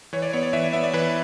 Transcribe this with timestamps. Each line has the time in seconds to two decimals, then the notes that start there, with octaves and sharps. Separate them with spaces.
0.13 E3 C#5
0.22 D5
0.33 B3 C#5
0.43 D5
0.53 E3 E5
0.64 D5
0.73 B3 E5
0.84 D5
0.93 E3 B4